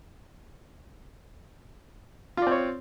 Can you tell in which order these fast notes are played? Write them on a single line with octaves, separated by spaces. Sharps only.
F4 D5 C4 C#5